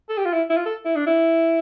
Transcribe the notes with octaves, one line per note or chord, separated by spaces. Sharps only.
A4
G4
F4
E4
E4
F4
A4
E4
D4
E4